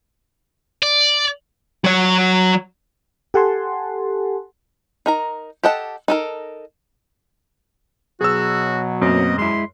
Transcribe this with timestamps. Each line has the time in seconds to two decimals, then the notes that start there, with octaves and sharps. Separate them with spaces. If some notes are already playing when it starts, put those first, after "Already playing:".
0.83 D5
1.84 F#3 C#5
3.34 G4 A4 F#5 G#5 A5 C6
5.06 D#4 A#4 A#5
5.63 G4 A4 D#5 F#5 A5
6.08 D#4 A4 A#4
8.21 B2 F#3 F#4 G#4 E6
9.02 F#2 A#3 C4 D#5
9.38 G#3 E4 C6